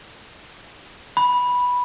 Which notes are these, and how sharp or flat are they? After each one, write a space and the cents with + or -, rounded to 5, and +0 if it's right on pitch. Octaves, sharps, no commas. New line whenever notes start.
B5 -5